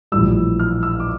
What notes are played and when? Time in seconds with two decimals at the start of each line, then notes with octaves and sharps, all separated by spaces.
0.12 A#1 A2 E3 G3 E6
0.59 F6
0.83 E6
1.00 D6